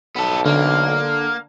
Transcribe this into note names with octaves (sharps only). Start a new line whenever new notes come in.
B1 B3 A4
D3 A#3